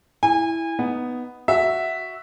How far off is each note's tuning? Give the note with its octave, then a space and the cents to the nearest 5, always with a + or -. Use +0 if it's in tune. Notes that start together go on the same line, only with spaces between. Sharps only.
E4 +0 G#5 -30
B3 +0 D#4 +0
F#4 +0 E5 +0